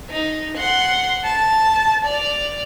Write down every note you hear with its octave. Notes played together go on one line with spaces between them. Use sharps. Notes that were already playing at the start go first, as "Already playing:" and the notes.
D#4
F#5 C6
A5
D5 F7